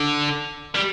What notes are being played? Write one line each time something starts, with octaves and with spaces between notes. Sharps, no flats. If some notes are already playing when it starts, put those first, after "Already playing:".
Already playing: D3
G3